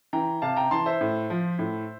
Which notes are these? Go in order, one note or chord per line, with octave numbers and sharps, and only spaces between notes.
E3 G5 A#5
C3 F5 A5
G5 A#5
E3 A5 C6
C5 E5
A2
F3
A2